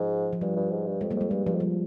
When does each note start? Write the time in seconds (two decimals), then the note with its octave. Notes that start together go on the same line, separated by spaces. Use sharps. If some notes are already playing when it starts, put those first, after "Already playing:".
Already playing: G#2 F3
0.33 F3
0.41 G2 G3
0.56 G2
0.71 G#2
0.86 G2
1.01 F2 G#3
1.11 G3 A#3
1.16 F2 G#3
1.31 G2 G3
1.46 G2 F3
1.54 F2
1.60 G3